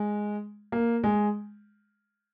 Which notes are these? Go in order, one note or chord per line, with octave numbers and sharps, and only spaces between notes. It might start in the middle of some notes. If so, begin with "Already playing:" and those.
Already playing: G#3
A#3
G#3